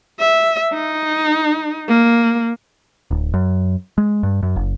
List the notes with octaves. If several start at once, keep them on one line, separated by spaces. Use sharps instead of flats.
E5
D#4
A#3
D1
F#2
G#3
G2
F#2
F#1